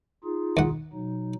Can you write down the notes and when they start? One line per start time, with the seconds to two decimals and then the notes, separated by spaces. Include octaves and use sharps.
0.24 D#4 F4 G#4
0.57 D#2 F#5
0.93 B2 F#3 D#4